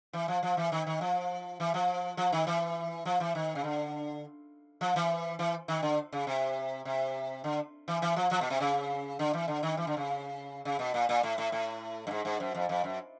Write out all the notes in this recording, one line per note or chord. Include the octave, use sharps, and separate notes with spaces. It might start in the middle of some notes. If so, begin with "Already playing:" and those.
E3
F3
F3
E3
D#3
D#3
F3
E3
F3
F3
D#3
E3
F3
E3
D#3
C#3
D3
F3
E3
E3
D#3
D3
C#3
C3
C3
D3
E3
E3
F3
F3
B2
C3
C#3
D3
E3
D3
D#3
E3
D3
C#3
C#3
B2
A#2
A#2
A2
A2
A2
G2
G#2
G#2
F#2
F2
F2
F#2